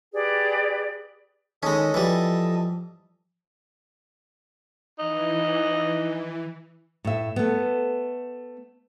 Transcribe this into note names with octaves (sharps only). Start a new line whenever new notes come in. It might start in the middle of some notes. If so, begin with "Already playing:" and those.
G4 G#4 B4 D5
D#3 G#3 C#4 A4 D#5
E3 F3 G3
E3 D#4
A2 E5
A3 B3